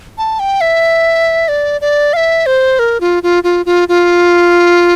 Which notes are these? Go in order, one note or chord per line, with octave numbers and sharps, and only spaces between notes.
A5
G5
E5
D5
D5
F5
E5
C5
A#4
F4
F4
F4
F4
F4